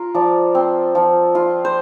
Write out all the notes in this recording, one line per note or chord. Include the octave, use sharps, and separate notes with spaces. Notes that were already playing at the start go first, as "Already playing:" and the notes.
Already playing: F4 A#4
F3 D5
C4
F3
F4
C5